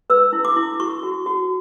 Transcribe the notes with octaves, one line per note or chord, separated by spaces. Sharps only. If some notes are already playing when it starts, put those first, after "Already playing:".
B4 E6
E4
D6
E4
F#4 C#6
F#4
F#4